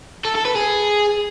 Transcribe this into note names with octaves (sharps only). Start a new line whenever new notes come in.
A4
A4
B4
G#4